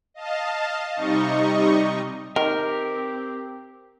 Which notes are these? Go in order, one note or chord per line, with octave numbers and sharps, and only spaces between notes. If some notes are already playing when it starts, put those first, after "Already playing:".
D#5 F5 A5
C3 G3 D#4 D#5 C#6
D#3 C4 G4 A#4